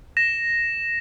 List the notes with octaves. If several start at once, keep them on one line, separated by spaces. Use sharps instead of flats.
A#6 E7